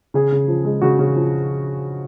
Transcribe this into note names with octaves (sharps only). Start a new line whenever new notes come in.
C#3 G#4
C#3
F3
G#3
C#3 F#4
C#3
F3